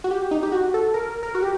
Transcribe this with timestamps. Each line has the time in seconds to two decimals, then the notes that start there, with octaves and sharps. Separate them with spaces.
0.04 F#4
0.11 G4
0.31 D#4
0.43 G4
0.52 F#4
0.74 A4
0.94 A#4
1.23 A#4
1.35 F#4
1.42 G4